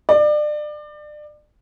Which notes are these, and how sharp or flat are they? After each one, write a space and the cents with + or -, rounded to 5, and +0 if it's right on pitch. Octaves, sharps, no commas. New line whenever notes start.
D5 +30